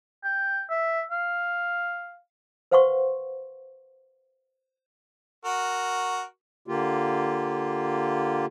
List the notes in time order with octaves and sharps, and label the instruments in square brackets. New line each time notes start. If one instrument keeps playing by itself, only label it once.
[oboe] G5
E5
F5
[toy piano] B4 C5 F5 F#5 C6 C#6
[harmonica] F#4 A#4
[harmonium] D3 A#3 F4 G4